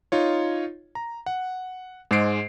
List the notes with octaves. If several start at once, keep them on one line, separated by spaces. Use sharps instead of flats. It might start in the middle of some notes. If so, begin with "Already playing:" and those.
D#4 F4 C#5
A#5
F#5
G#2 G#3 C5 C7 D7